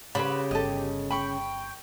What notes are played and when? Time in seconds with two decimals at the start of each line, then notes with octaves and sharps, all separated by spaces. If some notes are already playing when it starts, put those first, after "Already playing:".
0.15 C#3 G4 B4 C5 B5
0.51 G1 A4 D#5
1.11 G5 B5 C#6